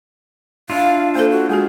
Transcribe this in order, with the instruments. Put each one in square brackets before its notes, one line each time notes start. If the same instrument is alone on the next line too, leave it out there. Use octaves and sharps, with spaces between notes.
[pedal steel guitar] D4 E4 F4 [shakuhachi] F5
[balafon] A#3 A4 [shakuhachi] C5
[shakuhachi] F#4
[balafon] G#3 F#4 [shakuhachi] G#4